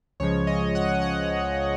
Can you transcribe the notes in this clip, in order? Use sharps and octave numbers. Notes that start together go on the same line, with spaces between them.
C#2 C#3 F3 G#3 C#5
D#5
F#5
F#5